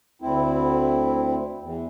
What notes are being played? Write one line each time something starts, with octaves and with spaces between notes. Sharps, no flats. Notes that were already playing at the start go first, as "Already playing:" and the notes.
D2 C4 E4
E2